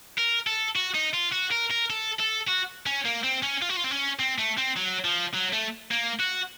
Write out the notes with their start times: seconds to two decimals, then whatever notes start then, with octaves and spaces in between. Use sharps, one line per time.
0.18 A#4
0.47 A4
0.76 F#4
0.95 D#4
1.14 F4
1.33 F#4
1.52 A#4
1.71 A#4
1.90 A4
2.19 A4
2.47 F#4
2.86 C#4
3.05 A#3
3.24 C4
3.43 C#4
3.62 F4
3.69 F#4
3.76 F4
3.84 C4
3.91 C#4
4.19 C4
4.38 A3
4.58 C4
4.77 F#3
5.05 F3
5.34 F#3
5.53 A3
5.92 A#3
6.20 F#4